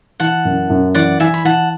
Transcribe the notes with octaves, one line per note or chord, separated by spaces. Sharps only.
E3 F#5 A5
F#2
F#2
E3 D5 F#5
E3 E5 G#5
B5
E3 F#5 A5